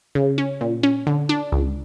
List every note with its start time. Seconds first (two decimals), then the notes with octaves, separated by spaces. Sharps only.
0.15 C#3
0.38 C#4
0.61 A#2
0.83 C#4
1.07 D3
1.29 D4
1.52 C#2